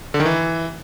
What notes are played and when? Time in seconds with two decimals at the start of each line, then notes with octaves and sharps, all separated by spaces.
0.14 D3
0.20 D#3
0.25 E3